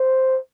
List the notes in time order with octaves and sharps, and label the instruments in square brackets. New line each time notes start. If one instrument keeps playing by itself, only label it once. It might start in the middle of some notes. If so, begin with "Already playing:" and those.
Already playing: [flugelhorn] C5